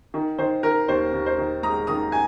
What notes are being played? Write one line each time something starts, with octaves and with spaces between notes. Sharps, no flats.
D#3
D#3 C5
D#3 A#4
D#2 C5
D#2
C5
D#3
G#3 A#5 D#6
D#3 A#5 D#6
G#5